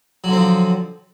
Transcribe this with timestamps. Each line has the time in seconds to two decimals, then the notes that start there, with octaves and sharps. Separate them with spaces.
0.24 F#3
0.28 D3
0.32 C4
0.37 F3